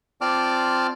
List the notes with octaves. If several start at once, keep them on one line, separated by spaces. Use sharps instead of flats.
C4 F4 D5 A5 D6 F6